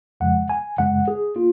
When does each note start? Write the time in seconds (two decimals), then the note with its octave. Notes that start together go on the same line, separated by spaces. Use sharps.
0.20 F2 C#3 F3 G#3 F#5
0.50 G#5
0.78 F#2 C#3 G#3 F#5
1.08 G#4
1.36 A#3 F4